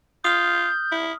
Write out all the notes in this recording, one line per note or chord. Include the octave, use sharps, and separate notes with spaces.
F4 D#6 F6 G6
E4